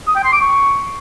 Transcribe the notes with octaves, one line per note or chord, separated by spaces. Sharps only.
D#6
G5
C6
D6
C#6